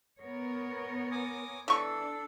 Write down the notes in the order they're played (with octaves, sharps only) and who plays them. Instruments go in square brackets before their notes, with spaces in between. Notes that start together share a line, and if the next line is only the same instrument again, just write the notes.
[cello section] B3 A#4 C#5
[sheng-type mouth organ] G#5 D6 D#6
[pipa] E3 C#6 [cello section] D4 [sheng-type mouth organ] A4